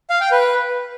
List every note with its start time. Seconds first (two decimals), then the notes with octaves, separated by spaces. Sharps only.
0.10 F5
0.21 G5
0.31 B4